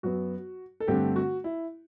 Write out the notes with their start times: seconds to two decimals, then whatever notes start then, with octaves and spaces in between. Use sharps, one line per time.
0.03 F#2 F#3 B3 F#4
0.80 A4
0.87 G2 D3 A3 C4 G4
1.16 F#4
1.44 E4